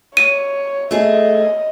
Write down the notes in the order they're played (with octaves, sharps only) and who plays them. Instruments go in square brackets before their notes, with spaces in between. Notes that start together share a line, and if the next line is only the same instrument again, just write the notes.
[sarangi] C#5 [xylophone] D#7
[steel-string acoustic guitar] A3 G#4 [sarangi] D#5